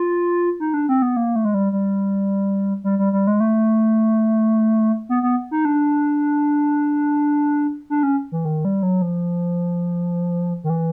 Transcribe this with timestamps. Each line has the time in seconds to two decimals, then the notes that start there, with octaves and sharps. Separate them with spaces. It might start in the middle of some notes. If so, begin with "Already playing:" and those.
Already playing: F4
0.60 D#4
0.74 D4
0.89 C4
1.02 B3
1.17 A#3
1.36 A3
1.45 G#3
1.54 G3
1.72 G3
2.84 G3
2.99 G3
3.13 G3
3.27 G#3
3.40 A3
5.09 B3
5.23 B3
5.51 D#4
5.65 D4
7.90 D4
8.03 C#4
8.32 E3
8.45 D#3
8.65 G3
8.83 F#3
9.02 F3
10.64 D#3
10.70 E3